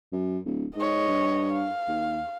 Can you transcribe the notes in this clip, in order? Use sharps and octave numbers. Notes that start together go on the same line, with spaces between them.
F#2
D1
G#2 C#5 D#5
G2
F5
D#2